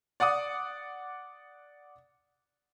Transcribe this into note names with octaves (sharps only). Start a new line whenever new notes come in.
D5 F#5 D6 D#6